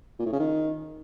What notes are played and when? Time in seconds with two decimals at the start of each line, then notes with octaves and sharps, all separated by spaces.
0.19 A#2
0.26 A2
0.32 C#3
0.39 D#3